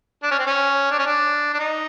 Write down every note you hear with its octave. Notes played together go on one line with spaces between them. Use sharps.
D4
C#4
C4
C#4
D4
C#4
D4
D4
D#4